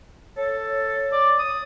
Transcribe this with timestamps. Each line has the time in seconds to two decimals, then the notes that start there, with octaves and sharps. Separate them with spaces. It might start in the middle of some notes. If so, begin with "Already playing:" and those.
0.37 A4 C#5
1.12 D5
1.38 D#6